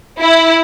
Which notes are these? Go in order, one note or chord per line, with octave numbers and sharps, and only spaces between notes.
E4